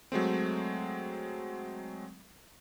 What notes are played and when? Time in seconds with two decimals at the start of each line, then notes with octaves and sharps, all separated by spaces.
0.12 F#3 G#3 A3 C4